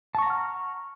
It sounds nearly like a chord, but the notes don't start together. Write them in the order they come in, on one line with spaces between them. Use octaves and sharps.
A5 C#6 A#5 F#5 F6